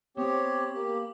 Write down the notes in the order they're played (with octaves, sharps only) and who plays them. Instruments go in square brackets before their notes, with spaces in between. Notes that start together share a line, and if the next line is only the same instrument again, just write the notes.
[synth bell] B3 [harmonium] C4 G4 C#5
[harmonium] A#3 G4